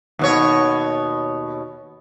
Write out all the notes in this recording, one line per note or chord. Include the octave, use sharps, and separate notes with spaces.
D#2 B2 C#5